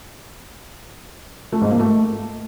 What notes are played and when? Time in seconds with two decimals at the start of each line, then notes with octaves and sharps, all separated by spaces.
1.52 A3
1.61 G#2
1.70 A#3
1.79 A3